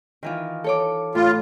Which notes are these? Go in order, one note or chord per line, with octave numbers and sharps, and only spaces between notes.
D#3 E3 F4
A4 C#5 D6
A2 F4